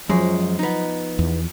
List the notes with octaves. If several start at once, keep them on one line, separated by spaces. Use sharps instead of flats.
F#2 F3 F#3 G#3
B3 D#4
E2